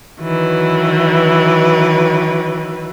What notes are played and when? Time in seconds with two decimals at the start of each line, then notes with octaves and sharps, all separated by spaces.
0.21 D#3 E3 F#3 B4